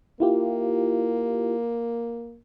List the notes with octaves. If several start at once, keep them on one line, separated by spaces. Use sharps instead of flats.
A#3 E4 F4 G4